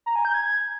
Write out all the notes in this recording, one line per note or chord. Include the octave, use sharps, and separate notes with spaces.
A#5
G#5
G6
G#6